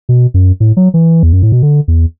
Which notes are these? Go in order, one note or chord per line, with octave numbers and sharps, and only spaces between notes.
B2
F#2
A2
F#3
E3
E2
F#2
A2
B2
D3
E2